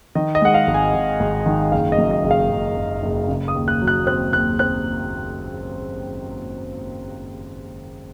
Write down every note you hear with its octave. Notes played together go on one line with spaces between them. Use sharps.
D#3 D#5
D#5
G#3 F#5
F5
G#1
G#5
G#1
G#1
D#3
F#1 F5
D#5
F#2
D#5
F#1
F5
F#1
F#1
F#1
C#3
D#6
D#2
F#6
F#3
F#6
C4 F#6
D#2 F#6
C4 F#6